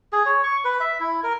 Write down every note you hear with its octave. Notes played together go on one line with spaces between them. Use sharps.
G#4
C#5
C#6
B4
E5
E4
A#4